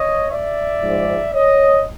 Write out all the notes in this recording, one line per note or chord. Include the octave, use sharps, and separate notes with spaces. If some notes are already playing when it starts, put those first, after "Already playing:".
Already playing: C#5 D#5
D5 E5
G#2 F3
C#5 D#5